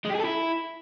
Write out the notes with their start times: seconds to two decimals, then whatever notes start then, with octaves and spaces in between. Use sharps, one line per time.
0.05 G#3
0.10 G4
0.15 G#4
0.20 A4
0.25 E4